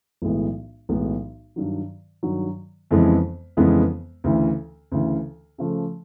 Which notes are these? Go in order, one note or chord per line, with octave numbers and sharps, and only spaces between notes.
B1 A2 E3 G#3 B3
B1 A2 E3 G#3 B3
G2 D#3 F#3
G2 D#3 F#3
F2 C#3 E3 G#3 B3
F2 C#3 E3 G#3 B3
D2 C#3 E3
D2 C#3 E3
C#3 F3 A3